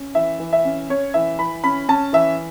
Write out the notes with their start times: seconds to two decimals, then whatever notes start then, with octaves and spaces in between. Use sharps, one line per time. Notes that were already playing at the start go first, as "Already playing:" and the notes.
Already playing: C#4
0.15 E3 E5
0.40 E3
0.53 E5
0.65 C#4
0.90 C#4 C#5
1.14 E3 E5
1.39 E3 B5
1.64 C#4 B5
1.89 C#4 A5
2.13 E3 E5